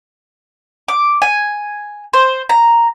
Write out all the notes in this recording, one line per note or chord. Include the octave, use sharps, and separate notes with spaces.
D6
G#5
C5
A#5